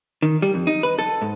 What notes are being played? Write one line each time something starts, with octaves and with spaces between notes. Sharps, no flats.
D#3
G3
F2
D#4
B4
A4
G#2